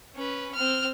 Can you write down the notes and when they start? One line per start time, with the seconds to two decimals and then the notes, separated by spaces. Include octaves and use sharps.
0.16 C#4 B4
0.55 C4 F6